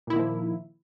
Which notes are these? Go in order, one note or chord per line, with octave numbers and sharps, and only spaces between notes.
A#2 D#3 F3 A#3 E4